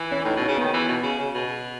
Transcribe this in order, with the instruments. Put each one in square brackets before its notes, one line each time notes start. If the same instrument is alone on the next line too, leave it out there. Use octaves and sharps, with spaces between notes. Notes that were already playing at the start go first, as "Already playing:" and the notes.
Already playing: [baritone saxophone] E3
[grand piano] C#4
[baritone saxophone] A2 [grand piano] D#4
[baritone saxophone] B2
[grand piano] C#4
[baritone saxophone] C#3
[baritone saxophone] D#3 [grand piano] B3
[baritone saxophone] E3
B2
C#3
C#3
B2